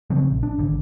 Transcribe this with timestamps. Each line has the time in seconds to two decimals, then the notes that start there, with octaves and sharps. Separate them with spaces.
0.10 C#3 F3 F#3 C4
0.31 A#1
0.43 D4
0.59 G#1 D3